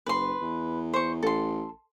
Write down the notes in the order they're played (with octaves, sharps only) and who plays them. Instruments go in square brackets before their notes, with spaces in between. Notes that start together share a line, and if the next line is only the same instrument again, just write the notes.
[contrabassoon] F#1 [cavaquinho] B4 C6
[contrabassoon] E2
[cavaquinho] C5 C#6
[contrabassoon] A1 [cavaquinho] A4 C6